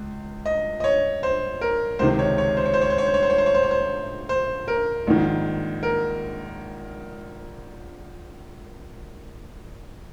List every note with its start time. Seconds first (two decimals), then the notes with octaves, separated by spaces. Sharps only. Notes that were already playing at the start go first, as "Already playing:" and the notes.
Already playing: C#2
0.46 D#5
0.80 D#5
0.84 C#5
1.23 C5
1.61 A#4
1.99 C#2 C3 D#3 C5
2.19 C#5
2.38 C#5
2.57 C5
2.66 C#5
2.74 C5
2.81 C#5
2.90 C5
2.98 C#5
3.06 C5
3.14 C#5
3.23 C5
3.30 C#5
3.38 C5
3.46 C#5
3.55 C5
3.63 C#5
3.71 C5
4.29 C5
4.68 A#4
5.07 A#1 G#2 D#3
5.83 A#4